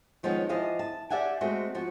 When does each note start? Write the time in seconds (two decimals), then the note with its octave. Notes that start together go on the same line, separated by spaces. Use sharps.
0.23 D#3 F3 G#3 B3 C#4
0.49 E3 F3 D#5 F5 A5
0.79 A5
1.10 G4 D5 E5 F#5 G#5
1.41 G#3 A3 C4 F#4
1.75 F3 F#4